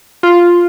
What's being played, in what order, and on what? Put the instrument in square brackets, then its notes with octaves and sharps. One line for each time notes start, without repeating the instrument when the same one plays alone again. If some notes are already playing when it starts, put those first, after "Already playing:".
[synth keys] F4